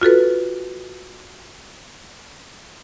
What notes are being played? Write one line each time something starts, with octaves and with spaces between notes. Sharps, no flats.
F4 F#4 A4 B4